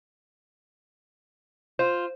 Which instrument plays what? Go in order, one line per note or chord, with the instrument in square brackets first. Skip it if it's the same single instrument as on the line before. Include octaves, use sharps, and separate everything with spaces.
[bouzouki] F4 [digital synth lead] C5